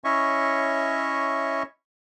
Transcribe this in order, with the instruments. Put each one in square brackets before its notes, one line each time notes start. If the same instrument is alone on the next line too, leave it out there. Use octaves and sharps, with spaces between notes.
[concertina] C#4 E4 C#5 D#5 E5 C#6